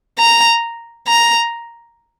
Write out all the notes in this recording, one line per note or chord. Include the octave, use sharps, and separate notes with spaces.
A#5
A#5